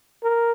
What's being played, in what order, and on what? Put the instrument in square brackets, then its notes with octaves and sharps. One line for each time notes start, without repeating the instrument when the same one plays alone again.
[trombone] A#4